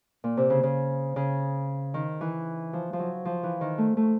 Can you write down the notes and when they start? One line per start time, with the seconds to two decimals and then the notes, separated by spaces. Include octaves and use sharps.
0.24 A#2
0.37 C3
0.50 C#3
0.63 C#3
1.16 C#3
1.94 D#3
2.21 E3
2.73 F3
2.93 F3
2.99 F#3
3.25 F3
3.43 E3
3.61 D#3
3.78 A3
3.97 A3